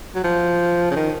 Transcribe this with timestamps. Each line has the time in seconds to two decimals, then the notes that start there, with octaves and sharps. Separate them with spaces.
0.15 F#3
0.24 F3
0.91 C#3
0.96 D#3